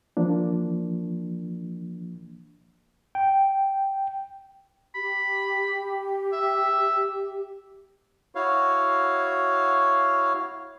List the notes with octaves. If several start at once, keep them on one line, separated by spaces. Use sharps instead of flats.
E3 F3 A#3 D4
G5
G4 B5
E5
E4 F#4 C#5 F5